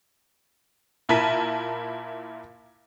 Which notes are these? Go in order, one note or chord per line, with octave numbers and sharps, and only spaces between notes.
A#2 E4 A#4 A5 B6 D#7